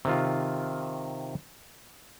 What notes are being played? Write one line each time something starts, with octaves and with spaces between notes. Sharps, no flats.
C3 D#3 F4